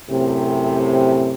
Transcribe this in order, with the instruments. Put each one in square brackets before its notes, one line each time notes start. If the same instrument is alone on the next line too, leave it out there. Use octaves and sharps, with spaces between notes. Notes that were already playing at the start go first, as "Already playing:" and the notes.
[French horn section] F#2 A2 C3